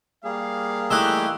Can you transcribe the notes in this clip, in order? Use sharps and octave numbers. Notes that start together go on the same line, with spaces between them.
G3 A#3 G#4 F5
E3 A3 D#4 G4 E6 F#6